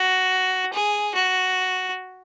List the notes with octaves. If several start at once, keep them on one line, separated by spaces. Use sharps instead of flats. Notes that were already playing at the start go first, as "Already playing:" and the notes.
Already playing: F#4
G#4
F#4